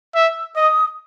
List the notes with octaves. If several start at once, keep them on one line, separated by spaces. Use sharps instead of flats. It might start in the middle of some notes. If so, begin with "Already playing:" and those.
E5 E6
D#5 D#6